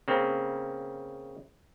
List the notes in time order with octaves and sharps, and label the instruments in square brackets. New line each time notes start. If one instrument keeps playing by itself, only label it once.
[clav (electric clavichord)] C#3 A#3 C4